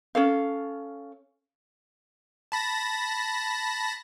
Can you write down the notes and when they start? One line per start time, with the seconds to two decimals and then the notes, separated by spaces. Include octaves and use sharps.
0.15 C#4 A4 F5
2.52 A5 B5 A#6